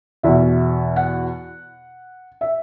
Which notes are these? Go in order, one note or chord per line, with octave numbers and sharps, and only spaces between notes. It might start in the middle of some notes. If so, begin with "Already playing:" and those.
E2 B2 E5
F#5
E5